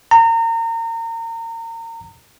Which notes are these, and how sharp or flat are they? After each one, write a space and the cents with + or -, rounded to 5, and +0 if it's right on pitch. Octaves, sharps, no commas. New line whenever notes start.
A#5 -30